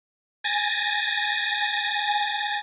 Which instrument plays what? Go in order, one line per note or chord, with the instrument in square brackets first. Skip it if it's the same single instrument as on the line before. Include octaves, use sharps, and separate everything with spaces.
[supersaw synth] G#5 A6 A#6